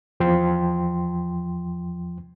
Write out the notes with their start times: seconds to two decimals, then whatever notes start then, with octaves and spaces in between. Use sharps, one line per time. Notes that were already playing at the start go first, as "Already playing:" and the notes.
0.20 E2 F3 G5 C6